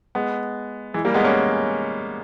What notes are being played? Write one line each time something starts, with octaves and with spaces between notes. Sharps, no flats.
G#3 B3
E3 G#3
G3 A#3
G#3 B3
A#3 C#4